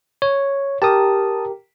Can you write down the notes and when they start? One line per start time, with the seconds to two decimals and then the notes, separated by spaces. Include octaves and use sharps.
0.22 C#5
0.82 G4 A#4 A5 D#6